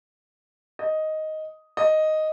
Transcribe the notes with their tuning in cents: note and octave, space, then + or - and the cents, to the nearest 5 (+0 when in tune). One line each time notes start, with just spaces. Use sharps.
D#5 +5
D#5 +0